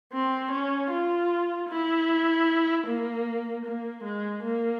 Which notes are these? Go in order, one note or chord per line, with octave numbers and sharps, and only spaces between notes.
C4
C#4
F4
E4
A#3
A#3
G#3
A#3